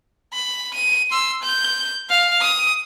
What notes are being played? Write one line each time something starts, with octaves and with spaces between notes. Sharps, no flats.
B5
D#7
C6 E6
G6
F5
D#6